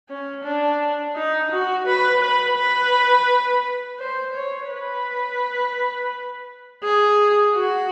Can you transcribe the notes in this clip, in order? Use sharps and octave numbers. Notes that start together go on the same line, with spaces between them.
C#4
D4
D#4
F#4
B4
B4
B4
C5
C#5
B4
G#4
F#4